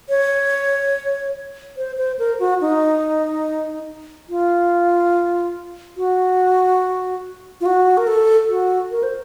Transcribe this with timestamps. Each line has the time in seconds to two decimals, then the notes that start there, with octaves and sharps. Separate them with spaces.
0.09 C#5
1.77 C5
1.98 C5
2.19 A#4
2.39 F#4
2.61 D#4
4.29 F4
5.97 F#4
7.61 F4
7.66 F#4
7.97 A#4
8.07 A4
8.49 F#4
8.91 A#4
9.03 C5